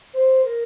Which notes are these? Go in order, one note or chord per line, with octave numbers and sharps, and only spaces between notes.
C5
A#4